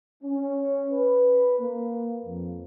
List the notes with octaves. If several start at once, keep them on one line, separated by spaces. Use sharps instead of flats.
C#4
B4
A#3
F2